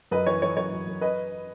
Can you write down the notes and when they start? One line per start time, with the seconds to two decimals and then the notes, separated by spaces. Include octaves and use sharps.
0.11 F#2 B4 D#5
0.26 E3 C#5
0.42 E3 C#5
0.56 F#2 C#5
0.72 F#2
0.87 F#2
1.01 B4 D#5